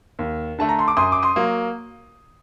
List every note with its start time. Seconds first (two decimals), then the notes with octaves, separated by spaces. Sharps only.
0.19 D#2
0.58 D3 A3 A5
0.69 A#5
0.79 C6
0.88 D6
0.97 F#2 C6 D#6
1.12 D6
1.23 C6 D#6
1.36 F#3 A#3